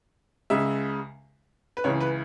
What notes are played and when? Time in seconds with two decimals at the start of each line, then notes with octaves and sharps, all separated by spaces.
0.50 C#2 C#3 G#3 E5
1.77 B4
1.84 C#2 C#3 E3 C#5
2.00 B4